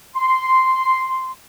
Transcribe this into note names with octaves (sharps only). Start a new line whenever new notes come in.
C6